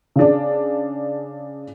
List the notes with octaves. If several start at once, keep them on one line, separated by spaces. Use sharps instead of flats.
C#3 D4